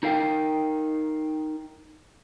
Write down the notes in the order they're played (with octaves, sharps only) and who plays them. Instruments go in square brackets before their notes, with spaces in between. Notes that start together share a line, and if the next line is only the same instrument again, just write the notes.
[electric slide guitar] D#4 A#4 F5 G5